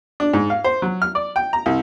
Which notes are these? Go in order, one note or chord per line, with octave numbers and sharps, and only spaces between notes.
D4
G#2
F5
C5
F#3
F6
D5
G5
A#5
C2